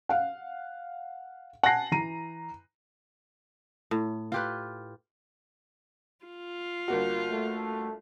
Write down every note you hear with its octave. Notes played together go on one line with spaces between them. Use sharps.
F5 F#5
F#5 G#5 A5 A#6 C7
E3 A#5 D#7
A2
F4 G4 B4
F4
G1 A#3 F#4
A3